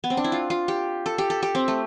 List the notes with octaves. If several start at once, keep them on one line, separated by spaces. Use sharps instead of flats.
B3
C4
D4
E4
F4
F4
G4
A4
G4
A4
G4
C4
A3